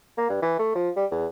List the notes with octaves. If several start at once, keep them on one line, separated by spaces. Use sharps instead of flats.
A#3
G2
E3
A3
F3
G3
E2